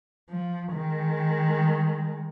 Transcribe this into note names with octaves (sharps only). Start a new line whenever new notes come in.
F3
D#3 G#3